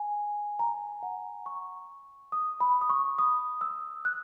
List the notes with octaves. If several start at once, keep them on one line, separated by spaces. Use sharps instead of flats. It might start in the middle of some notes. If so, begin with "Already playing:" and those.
Already playing: G#5
A#5
F#5
C#6
D#6
B5
D#6
C#6
D#6
E6
F#6